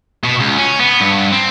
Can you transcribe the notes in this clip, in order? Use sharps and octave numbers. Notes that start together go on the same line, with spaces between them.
B2
C#2
C#4
B3
G2
C4